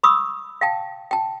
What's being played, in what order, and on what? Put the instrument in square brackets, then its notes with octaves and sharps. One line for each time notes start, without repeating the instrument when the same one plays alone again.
[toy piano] B5 C#6 D#6 E6
F5 G5 A5
G5 A5